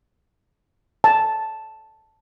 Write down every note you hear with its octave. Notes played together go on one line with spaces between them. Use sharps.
A5